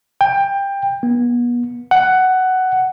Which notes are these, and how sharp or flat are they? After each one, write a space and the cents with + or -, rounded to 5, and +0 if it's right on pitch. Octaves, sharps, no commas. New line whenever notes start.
G5 +20
B3 -35
F#5 +10